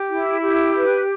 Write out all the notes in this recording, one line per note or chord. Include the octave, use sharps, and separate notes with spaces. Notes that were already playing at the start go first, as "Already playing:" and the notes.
Already playing: G4
E4
G4
B4